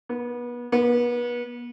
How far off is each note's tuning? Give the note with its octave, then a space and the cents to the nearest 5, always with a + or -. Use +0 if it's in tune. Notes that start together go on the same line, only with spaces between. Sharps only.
B3 -30
B3 -35